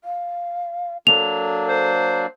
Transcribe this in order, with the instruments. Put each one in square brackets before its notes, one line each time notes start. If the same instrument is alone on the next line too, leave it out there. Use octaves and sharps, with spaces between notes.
[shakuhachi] F5
[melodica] F#3 A#3 D4 [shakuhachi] A4 [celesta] F7
[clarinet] C5